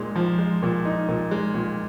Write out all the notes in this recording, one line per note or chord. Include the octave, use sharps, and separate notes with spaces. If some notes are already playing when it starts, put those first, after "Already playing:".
Already playing: A#2 G#3 D#4
F3
G#3
A#2
D#4
A#2
G#3
A#2